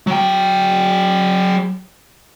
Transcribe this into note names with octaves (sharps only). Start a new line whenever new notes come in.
F#3 G5